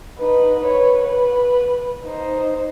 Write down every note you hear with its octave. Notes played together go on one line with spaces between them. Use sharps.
D#4 B4
B4 C#5
B4
D#4 C5